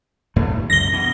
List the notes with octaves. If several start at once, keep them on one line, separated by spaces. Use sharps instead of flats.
D#2 A2 A3
C#2 F#2 A#6 G7
B2 E3